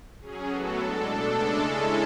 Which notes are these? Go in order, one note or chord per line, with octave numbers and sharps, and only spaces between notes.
F#3 C#4 G#4
A2 F#3 B3 F#4 A4
G#3 D4 A4
B2 A3 D4 A4
C#3 G#3 D4 A4
G#3 C#4 E4 A4